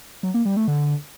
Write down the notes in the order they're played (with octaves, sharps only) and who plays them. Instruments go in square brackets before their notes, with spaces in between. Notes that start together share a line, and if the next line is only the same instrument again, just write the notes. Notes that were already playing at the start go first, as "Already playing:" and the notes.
[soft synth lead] F#3
A#3
G3
A3
D3